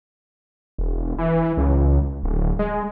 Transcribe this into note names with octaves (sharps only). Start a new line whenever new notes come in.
E1
E3
C#2
D1
G#3